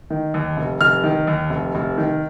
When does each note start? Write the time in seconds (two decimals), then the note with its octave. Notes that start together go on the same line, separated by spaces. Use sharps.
0.10 D#3
0.34 D#2
0.57 F1
0.81 F1 F6
1.04 D#3
1.27 D#2
1.50 F1
1.75 F1
1.98 D#3